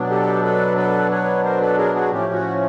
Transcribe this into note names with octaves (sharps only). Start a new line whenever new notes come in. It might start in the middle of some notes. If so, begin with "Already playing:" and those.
Already playing: B2 F#3 B3 D4
G4 A4
A4 B4
A4 B4
B4 C#5
A#4 C5
A4 B4
G#4 A#4
F#4 G#4
A2 F3 A3 C#4 G4
F#4